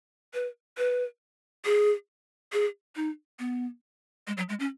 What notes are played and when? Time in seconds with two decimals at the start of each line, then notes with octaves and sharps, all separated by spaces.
0.34 B4
0.78 B4
1.65 G#4
2.52 G#4
2.96 D#4
3.39 B3
4.27 G#3
4.37 F#3
4.49 G#3
4.60 C#4